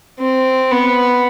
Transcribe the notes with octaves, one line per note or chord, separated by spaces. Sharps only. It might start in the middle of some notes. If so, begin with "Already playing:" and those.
C4
B3